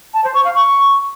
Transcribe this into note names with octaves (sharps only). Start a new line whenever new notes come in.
A5
C5
C#6
F5
C#6